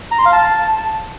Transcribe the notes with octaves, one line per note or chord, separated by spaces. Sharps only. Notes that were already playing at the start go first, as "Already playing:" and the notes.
A#5
C6
F5
A5